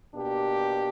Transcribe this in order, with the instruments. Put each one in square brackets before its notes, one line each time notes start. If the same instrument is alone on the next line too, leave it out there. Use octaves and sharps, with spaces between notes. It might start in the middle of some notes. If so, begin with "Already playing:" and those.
[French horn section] B2 A#3 D4 G4